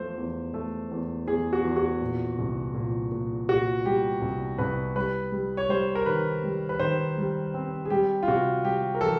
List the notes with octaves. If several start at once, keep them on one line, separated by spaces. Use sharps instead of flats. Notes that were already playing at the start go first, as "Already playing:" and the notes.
Already playing: E2 F3 A3 C5
E2
A3
E2
E2 G#4
F#4
E2
F#4
A#2
C2
A#2
A#2
A#2 F#4
G3 G4
C2
C2 B4
G3 B4
G3
C#5
G3 C5
A#4
D#3 B4
G3
B4
D#3 C5
G3
C4
G#4
G3 G4
F4
C3 F#4
G3 G4
A#4
E3 A4